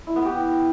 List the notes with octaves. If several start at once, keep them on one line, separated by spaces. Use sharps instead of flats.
E4
B3
G4